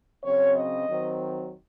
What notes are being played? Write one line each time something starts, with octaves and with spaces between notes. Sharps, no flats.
C#3 F#3 C4 C#5
D#5
D#3 F#3 C4